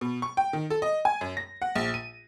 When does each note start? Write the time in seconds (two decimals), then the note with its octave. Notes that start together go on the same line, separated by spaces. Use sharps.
0.01 B2
0.22 C#6
0.37 G5
0.53 D#3
0.70 A4
0.82 D#5
1.05 G#5
1.21 F#2
1.37 A#6
1.62 F#5
1.75 A#1
1.94 D#7